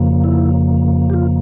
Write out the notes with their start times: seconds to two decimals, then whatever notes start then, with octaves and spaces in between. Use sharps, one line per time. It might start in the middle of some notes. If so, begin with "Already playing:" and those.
Already playing: F2 C#3 F3 A#3
0.24 E4
1.10 G4
1.13 F4